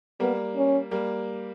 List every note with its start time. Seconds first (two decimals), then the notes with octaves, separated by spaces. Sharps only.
0.20 G3 A#3 B3
0.56 C#4
0.91 G3 A#3